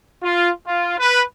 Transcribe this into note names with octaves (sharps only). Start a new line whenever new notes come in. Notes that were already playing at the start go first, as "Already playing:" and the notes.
F4
F4
B4